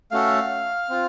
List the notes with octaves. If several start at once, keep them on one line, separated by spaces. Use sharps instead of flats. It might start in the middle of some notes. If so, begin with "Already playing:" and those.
A3 C#4 F#4 A4 F5
C4 F4